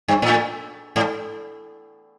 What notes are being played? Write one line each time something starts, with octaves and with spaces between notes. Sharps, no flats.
G2
A2
G#2